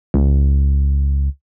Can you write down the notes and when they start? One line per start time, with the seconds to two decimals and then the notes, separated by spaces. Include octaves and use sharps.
0.14 C#2